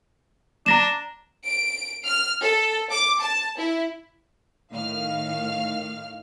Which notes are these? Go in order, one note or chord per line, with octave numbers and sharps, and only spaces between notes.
D4 A#5 A#6 E7
D7
F6
A4
D6
A5
E4
A2 D#3 F5 F6